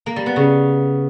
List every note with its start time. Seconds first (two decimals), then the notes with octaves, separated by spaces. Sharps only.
0.06 A#3
0.16 G3
0.26 B3
0.36 C#3